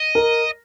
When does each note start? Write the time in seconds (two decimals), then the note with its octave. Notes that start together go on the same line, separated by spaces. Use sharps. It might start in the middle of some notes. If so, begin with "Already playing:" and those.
Already playing: D#5
0.15 A#4